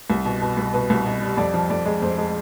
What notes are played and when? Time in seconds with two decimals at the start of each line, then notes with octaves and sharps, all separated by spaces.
0.10 C2
0.25 B2
0.41 B2
0.57 C2
0.74 B2 B4
0.90 C2
1.06 B2
1.22 G3
1.37 F2 D5
1.54 F3
1.70 F2 D5
1.86 G#3
2.02 F2 C5
2.18 G#3